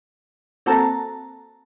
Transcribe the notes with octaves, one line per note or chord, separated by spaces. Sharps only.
A#3 C4 F#4 A4 A5 A#5